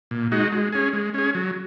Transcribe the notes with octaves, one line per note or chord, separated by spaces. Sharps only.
A#2
G#3 D#4 F#4
G#3
C#4 G#4
G#3
C#4 G#4
F#3